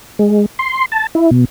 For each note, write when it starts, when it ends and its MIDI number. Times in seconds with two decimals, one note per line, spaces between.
0.19 0.46 56
0.59 0.86 84
0.92 1.07 81
1.15 1.30 64
1.31 1.45 47